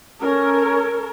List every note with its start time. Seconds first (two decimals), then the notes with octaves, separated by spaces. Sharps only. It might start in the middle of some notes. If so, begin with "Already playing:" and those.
0.21 C#4 A4 A#4